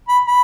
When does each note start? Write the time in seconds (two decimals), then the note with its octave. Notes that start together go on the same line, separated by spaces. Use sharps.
0.09 B5
0.28 B5